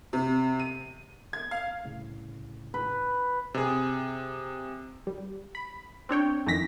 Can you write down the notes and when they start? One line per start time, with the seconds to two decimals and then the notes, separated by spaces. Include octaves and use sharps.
0.13 C3
0.60 D#7
1.33 G#6
1.51 F5
1.85 C2 A2 C#3
2.74 B4
3.54 C3 G#4
5.07 G3
5.55 B5
6.09 C4 D4 C#5 G5
6.46 F2 D#3 E3 A#6 B6